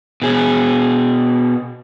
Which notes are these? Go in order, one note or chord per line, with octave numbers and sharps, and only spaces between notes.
B2 G#4